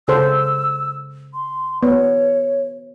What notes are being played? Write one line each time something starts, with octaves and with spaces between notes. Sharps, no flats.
C#3 A4 C5 E6
C6
B3 C#5